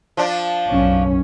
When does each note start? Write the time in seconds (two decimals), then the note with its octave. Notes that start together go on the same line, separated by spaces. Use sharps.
0.17 F3 D4
0.68 B1 F#2 C#4